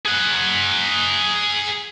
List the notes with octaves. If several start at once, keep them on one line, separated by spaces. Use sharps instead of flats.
G#4 F#5